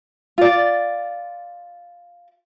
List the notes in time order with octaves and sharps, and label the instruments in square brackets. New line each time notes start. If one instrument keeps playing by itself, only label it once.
[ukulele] F4 D5